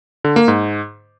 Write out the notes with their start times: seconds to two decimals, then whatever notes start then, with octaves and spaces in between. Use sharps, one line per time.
0.24 D3
0.36 A#3
0.48 G#2